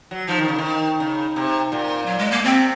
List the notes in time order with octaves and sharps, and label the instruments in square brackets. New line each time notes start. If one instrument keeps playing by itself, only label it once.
[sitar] F#3
[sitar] F3 [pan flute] D#4
[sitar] D#3
C#3
D#3
C#3
C3
A#2
[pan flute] F#3
G#3
A#3
[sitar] C3 [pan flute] C4